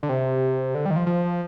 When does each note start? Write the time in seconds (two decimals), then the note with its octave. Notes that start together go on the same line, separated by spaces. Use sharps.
0.03 D3
0.09 C3
0.75 D3
0.85 G3
0.91 D#3
0.96 F3
1.06 F3